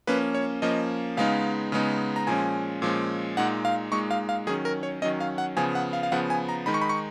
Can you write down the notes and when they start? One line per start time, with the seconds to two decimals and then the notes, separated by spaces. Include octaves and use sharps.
0.07 F3 A#3 C#4 B4
0.34 C#5
0.62 F3 A#3 C#4 D#5
1.17 C#3 G#3 B3 D#4 F5
1.72 C#3 G#3 B3 D#4
2.16 A#5
2.27 A#2 F3 G#3 C#4 G#5
2.82 A#2 F3 G#3 C#4
3.37 A#2 G#3 D#4 F#5
3.65 F5
3.91 A#2 G#3 D#4 C#6
4.11 F5
4.29 F5
4.47 D#3 F#3 C#4 G#4
4.65 A#4
4.83 C#5
5.02 D#3 F#3 C#4 D#5
5.20 F5
5.38 F#5
5.57 C#3 F3 B3 G#5
5.75 F#5
5.93 F5
6.03 F5
6.12 C#3 F3 B3 F#5
6.30 G#5
6.49 A#5
6.66 D#3 G#3 D#4 B5
6.74 C#6
6.81 B5
6.89 C#6